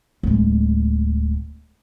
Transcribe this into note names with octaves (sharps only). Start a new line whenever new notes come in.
D1 G#3